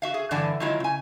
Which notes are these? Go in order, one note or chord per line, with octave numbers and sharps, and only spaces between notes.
F#4 E5 F5
G#4
G2 D3 E3 D5 F#5 A5
D#3 F#3 G#3 E4 F4
C#3 G#5